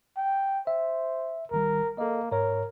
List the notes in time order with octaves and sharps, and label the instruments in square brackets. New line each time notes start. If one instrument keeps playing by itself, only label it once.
[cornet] G5
[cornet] C5 [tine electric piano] E5
[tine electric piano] G#1 D#3 G3 [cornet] A#4
[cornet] A#3 [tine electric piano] A4 D#5
[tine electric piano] G#2 C#5 [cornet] A#4